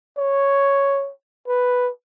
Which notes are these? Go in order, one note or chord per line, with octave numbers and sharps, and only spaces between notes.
C#5
B4